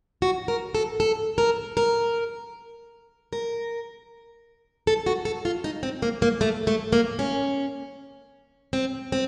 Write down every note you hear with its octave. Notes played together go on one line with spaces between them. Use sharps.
F#4
A#4
A4
A4
A#4
A#4
A#4
A4
F#4
A4
F4
D#4
C4
A#3
A#3
A3
A3
A#3
C#4
C4
C4